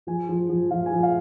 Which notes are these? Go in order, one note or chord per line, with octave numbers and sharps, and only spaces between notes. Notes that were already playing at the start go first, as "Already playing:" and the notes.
F3 G#5
F3
F3
F3 F5
G#5
F3
F5